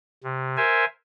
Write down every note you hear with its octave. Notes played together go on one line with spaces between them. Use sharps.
C3
A#4 C5 E5 G#5